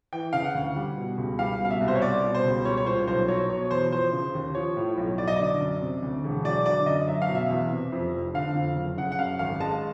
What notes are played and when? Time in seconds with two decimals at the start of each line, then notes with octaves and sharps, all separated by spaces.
0.13 E3 G5
0.33 C#3 F5
0.44 F#5
0.55 D2
0.76 G3
0.97 B2
1.18 C#2
1.39 G3 F5
1.60 B2 F5
1.70 E5
1.81 C2
1.88 C5
1.95 C#5
2.02 G3 D5
2.24 B2
2.34 C5
2.45 C#2
2.65 G3 C#5
2.77 C#5
2.86 A#2 C5
3.07 B1 C5
3.28 F#3 C#5
3.49 B2 C#5
3.71 E2 C5
3.91 F3 C5
4.13 C#3
4.34 D#2
4.55 F3 C#5
4.77 A2
4.97 B1
5.18 F#3 D5
5.27 D#5
5.36 D3 D5
5.61 F#2
5.81 C3
6.02 D2
6.24 E1
6.44 F#3 D5
6.66 D3 D5
6.86 F#2 D#5
7.08 F#3 E5
7.22 F5
7.29 B2
7.35 E5
7.50 E2
7.71 C3
7.92 F2
8.13 F1
8.34 D3 F5
8.55 F2
8.76 F#1
8.97 C#3 F#5
9.12 F#5
9.19 F#2 F5
9.39 G#1 F5
9.60 G#3 A5